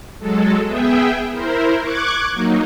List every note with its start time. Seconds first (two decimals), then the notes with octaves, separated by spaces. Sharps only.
0.19 F#3 G#3 A4
0.66 B3 G#4 E5 G5
1.30 E4 A#4 C5
1.81 C#6 D6 F#6 G#6
2.33 F#3 A#3 D#4